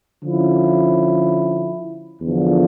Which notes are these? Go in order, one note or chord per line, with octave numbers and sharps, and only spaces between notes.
D3 F3 C#4 E4
E2 D3 F3